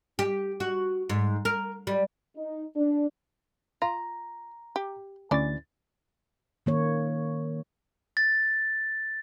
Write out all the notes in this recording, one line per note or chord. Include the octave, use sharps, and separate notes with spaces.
G4
F#4
G#2
A#4
G3
D#4
D4
F4 A#5
G4
D2 E3 C#4 D5 A6
D#3 A#3 C#5
A6